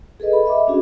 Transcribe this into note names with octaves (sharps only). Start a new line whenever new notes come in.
G#4 A4 B4 D#5
B5
D#5 E5 D6
C#4 D4 F#4 G#4